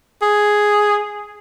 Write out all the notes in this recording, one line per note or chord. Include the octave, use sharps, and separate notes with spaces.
G#4